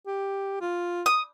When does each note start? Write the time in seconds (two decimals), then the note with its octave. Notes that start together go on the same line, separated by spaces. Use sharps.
0.07 G4
0.61 F4
1.06 D#6